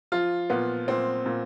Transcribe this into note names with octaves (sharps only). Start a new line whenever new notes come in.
F3 F4
A#2 B3
A#2 C4
A#2